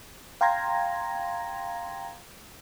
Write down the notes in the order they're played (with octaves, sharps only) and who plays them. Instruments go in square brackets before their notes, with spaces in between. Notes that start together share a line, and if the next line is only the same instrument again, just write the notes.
[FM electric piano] F5 G5 A#5 C6 G#6 A#6